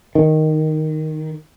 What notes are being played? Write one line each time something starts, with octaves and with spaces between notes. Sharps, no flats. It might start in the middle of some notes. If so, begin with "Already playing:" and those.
D#3